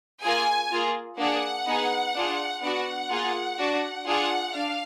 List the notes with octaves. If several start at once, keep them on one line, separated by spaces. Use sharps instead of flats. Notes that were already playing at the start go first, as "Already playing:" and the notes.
A#3 F4 G#4 G#5
A#3 F4 G#4
A#3 D4 G#4 F#5
B3 D#4 G#4
D4 F4 G#4
B3 D4 F#4 F#5
A#3 F4 G#4
D4 F#4
D4 F4 G#4 F#5
D4 F5